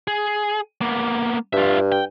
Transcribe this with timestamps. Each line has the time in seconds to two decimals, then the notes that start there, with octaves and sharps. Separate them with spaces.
0.07 G#4
0.81 A#3 B3
1.53 G2 F4 E5
1.92 G5